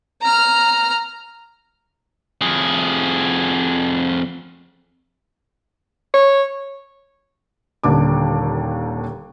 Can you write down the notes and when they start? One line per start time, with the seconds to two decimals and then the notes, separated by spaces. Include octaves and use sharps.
0.22 A#5 F6
2.41 F2 G#4
6.14 C#5
7.84 D#1 D#2 D3 D4 D6